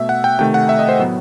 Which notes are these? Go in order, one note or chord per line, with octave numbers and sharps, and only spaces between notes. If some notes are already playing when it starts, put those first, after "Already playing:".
Already playing: B2 A3 E5
F#5
G5
C3 D#3 A3 G5
F#5
E5
D#5
C5
A2 F#3 B3